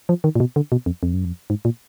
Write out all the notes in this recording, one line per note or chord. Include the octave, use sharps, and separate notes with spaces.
F3
D#3
A#2
B2
D3
B2
F2
F2
F#2
F2
G#2
A#2